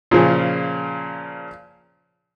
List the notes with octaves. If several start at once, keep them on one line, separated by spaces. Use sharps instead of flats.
A#2 C#3 F3 G#4